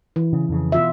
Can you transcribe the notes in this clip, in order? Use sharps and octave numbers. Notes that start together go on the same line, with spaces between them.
E3
C#3
F2 C#3
B2 F4 E5